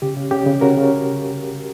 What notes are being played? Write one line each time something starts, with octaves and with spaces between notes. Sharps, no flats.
C#3 G4
C#3
C#3 G4
C#3
C#3 F#4 A#4
C#3